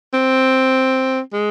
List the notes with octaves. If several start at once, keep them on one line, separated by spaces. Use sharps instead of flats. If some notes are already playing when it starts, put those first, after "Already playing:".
C4
G#3